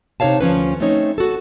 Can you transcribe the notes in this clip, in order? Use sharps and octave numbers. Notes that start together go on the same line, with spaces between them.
C3 D#4 A4 C#5 F5 A5
D2 F3 C#4 B4
A3 C4 C#4 D#4 C#5
F#4 A4